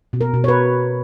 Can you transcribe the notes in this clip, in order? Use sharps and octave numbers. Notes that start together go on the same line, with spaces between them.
B2
A#4
B2
C#5
B4